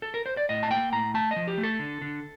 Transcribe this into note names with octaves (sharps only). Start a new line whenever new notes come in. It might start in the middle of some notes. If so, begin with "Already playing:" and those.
A4
A#4
C5
D5
A2 D#5
A5
A#3 G5
A2 A#5
A3 A5
D#5
F3
G4
A3
A4
D3
D3